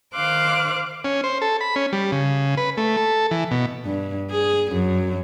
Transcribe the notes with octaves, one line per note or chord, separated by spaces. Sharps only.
D#3 C5 F5 D6 F#6
C#4
C5
A4
B5
C#4
G3
C#3
B4
A3
A4
E3
B2
G2
G#4
F#2